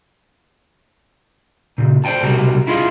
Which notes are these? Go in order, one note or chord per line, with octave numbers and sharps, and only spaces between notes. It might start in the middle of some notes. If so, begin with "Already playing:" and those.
A#2 C#3
C5 D5 E5 G5 A5
C2 B2 F#4 G4 A#4
E4 F4 G#4 D#5 F5